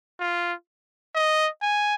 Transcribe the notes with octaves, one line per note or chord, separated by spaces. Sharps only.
F4
D#5
G#5